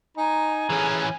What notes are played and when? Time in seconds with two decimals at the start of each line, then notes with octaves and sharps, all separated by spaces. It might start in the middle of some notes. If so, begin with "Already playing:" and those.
0.17 D#4 G#5 A#5
0.70 E3 C#4 G#4